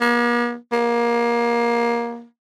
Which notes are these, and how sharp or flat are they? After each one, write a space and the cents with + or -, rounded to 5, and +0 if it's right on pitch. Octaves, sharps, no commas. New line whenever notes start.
A#3 +45
A#3 +20